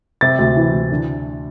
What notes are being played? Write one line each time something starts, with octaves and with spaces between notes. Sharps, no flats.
C3 A6
D2
E3
D2
D3